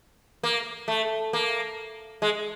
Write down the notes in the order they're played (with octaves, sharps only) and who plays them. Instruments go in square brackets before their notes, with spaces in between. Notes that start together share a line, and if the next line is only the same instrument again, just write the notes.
[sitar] A#3
A3
A#3
G#3